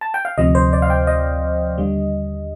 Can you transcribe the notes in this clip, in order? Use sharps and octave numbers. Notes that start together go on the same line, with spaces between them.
A5
G5
F5
D2 C3 F3 D#5
C5
D5
F5
G5
D#5
D#2 D3 G3